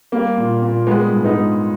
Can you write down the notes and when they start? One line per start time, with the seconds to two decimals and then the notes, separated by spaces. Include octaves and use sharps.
0.12 G3 A#3
0.37 A#2
0.62 A#2
0.87 G3 G#3 B3
1.12 G#2
1.24 B3 D#4
1.37 G#2